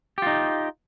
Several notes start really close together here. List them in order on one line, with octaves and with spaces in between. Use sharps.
G4 F4 D#4